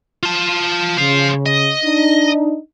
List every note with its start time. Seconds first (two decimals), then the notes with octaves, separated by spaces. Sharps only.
0.23 F4 A5
0.98 C#3 C5 F5
1.46 D#5
1.83 D4 D#4